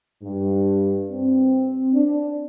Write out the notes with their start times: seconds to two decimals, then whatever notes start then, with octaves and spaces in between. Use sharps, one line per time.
0.23 G2
1.10 C4
1.94 D4